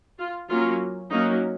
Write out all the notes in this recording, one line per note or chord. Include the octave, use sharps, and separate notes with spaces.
F4
F#3 A#3 C#4 F4
F#3 A#3 C#4 D#4